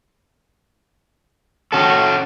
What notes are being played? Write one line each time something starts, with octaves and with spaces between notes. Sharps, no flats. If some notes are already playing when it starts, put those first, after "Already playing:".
C#4 F#4 A4 G5